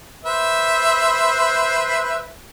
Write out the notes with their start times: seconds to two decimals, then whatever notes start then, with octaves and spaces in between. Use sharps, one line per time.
0.25 B4 C5 E5